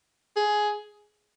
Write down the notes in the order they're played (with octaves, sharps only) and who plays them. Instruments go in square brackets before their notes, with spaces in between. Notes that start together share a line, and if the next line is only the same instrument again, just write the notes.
[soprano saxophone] G#4